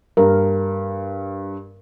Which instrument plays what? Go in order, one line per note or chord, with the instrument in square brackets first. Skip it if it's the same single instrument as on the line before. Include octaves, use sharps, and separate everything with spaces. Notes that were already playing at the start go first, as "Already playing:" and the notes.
[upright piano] G2 [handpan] A#4